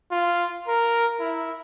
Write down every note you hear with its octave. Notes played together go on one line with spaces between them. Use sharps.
F4
A#4
E4